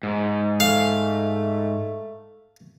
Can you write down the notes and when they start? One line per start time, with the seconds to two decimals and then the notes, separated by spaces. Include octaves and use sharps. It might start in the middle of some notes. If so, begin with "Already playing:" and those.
0.03 G#2
0.60 A3 F5